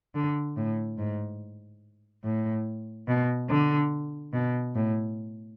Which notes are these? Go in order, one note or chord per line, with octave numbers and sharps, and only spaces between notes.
D3
A2
G#2
A2
B2
D3
B2
A2